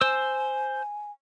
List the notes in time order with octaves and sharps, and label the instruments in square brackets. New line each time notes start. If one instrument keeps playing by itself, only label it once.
[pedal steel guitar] C5 E6 [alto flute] G#5